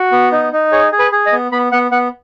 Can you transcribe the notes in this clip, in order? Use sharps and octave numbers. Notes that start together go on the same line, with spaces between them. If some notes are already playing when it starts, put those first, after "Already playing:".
Already playing: F#4
B3
D#4
D#4
G#4 C#5
G#4
B4
G#4
D#5
B3
B3 B5
B3 F#5
B3 F#5